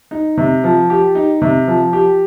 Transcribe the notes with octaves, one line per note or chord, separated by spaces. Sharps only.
D#4
C3
F3
G4
D#4
C3
F3
G4